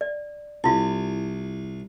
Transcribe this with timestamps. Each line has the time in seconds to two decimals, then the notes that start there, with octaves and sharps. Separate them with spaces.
0.01 D5
0.64 C2 E4 F4